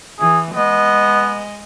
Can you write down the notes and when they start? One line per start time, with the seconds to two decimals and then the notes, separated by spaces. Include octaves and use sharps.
0.20 E3 G#4
0.54 G#3 B3 D#5